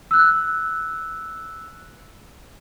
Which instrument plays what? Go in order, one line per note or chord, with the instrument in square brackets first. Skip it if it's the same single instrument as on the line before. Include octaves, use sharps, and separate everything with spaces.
[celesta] E6 F#6